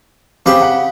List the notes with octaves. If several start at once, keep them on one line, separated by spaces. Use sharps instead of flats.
C#3 C4 G4 B4
F#5